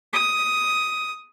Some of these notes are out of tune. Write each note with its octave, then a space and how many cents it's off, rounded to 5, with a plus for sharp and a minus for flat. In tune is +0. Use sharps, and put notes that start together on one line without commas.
D#6 +10